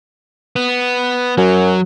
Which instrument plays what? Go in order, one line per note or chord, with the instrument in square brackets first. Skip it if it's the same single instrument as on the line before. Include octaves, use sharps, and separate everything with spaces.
[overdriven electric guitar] B3
[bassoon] F#2 [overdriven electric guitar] F#3